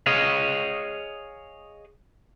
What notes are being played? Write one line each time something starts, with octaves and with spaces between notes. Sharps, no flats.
G#4 C#5 D#5 F5